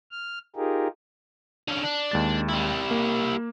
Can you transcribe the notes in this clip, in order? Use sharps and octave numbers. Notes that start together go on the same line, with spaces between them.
F6
D#4 F4 G4 G#4 A#4
D3 C#4
D4
D#2 G#3 A6
G3 E4
A#3